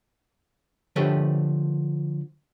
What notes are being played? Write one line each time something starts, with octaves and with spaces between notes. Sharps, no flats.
D3 F3 A3 G4 B4 C#5